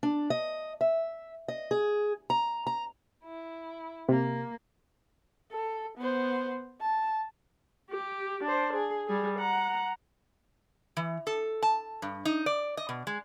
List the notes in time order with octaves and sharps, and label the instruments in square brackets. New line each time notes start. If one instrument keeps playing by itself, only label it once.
[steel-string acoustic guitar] D4
D#5
E5
D#5
G#4
A#5
A#5
[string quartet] E4
[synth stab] C3 [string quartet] A#3
[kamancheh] A4
B3 C5
A5
[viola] G4
D4 C5
G#4
G3 G#4
F#5 A#5
[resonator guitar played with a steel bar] E3
A4
A5
G2
D#4
D5
D#5
B2
G#3